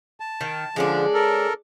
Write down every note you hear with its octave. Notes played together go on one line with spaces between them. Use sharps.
A5
D#3
D3 F3 G#3 C#4 D4
A4 A#4